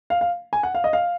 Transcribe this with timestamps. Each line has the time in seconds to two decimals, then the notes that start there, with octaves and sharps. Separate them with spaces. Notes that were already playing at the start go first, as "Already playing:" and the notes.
0.10 F5
0.21 F5
0.53 G#5
0.63 F#5
0.75 F5
0.84 D#5
0.93 F5